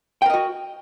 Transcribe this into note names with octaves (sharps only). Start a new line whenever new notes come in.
F#4 A#4 D#5 G5